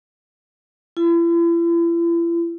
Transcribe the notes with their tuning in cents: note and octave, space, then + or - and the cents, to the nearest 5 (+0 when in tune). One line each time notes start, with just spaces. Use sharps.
E4 +45